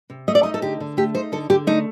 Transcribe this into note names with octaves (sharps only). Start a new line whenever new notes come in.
C3
A3 D#5
D5
D#4 D#5
A4
D3 G4
D3
A3 G4
D#4 C5
D3 A4
D3 G4
A3 D#4